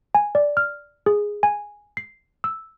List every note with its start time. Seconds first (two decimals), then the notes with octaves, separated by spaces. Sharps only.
0.15 G#5
0.35 D5
0.57 F6
1.06 G#4
1.43 G#5
1.97 C7
2.44 E6